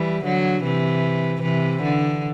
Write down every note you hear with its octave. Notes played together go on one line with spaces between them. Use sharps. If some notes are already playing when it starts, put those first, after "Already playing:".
Already playing: E3 G3
D3 F#3
C3 E3
C3 E3
D3